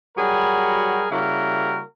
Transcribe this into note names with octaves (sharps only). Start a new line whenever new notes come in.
F#3 G3 F#4 G#4 A#4 B5
C#3 G3 A#3 E4 F#4 A#4